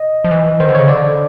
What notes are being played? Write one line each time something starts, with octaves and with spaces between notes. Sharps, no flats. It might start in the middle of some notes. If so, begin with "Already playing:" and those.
Already playing: D#5
F3
E3
D#3 C5
D3
C#3 C#5
D3 D5